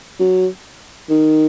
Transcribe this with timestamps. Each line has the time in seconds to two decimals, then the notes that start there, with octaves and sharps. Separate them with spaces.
0.20 F#3
1.09 D#3